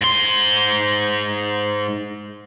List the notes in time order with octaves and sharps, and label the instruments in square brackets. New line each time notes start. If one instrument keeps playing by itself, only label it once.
[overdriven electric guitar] G#2 C6